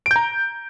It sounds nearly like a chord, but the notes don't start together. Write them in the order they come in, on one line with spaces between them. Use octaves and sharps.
D7 G6 A#5